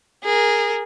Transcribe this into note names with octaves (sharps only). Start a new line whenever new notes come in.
G#4 A#4